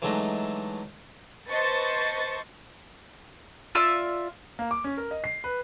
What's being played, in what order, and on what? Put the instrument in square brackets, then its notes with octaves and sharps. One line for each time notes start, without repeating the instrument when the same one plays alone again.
[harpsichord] E3 F#3 G#3 A3 D4 D#4
[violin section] B4 C5 D#5 A5 C#6 A6
[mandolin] F4 D5 E5 E6
[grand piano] A#3
D6
C#4
A#4
D#5
C7
B4